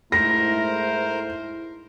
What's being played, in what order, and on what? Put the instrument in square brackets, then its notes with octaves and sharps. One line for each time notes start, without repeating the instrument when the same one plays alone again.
[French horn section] G#2 A3 [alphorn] E4 [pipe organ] A#4 C5 [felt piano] A#6